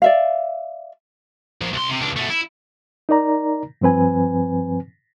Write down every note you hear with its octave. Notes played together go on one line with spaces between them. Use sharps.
D5 E5 F5
F3 A#3
C2 C6
C3
C#2 D4
B2 A3
E4
D#4 A#4 D5 A#5
G2 F3 C4 B4 G#5